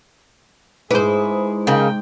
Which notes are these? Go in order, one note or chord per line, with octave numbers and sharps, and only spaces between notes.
G#2 E4 G#4 B4 C5 D6
C#3 A#3 D#4 G5